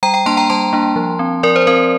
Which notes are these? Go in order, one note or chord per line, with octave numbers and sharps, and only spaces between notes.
G3 G5 A#5
G5 A#5
A#3 D4 A5 C6
G5 A#5
G3 A5 C6
A#3 D4
F3
C4
F3 A#4 D5
C5
C4 A#4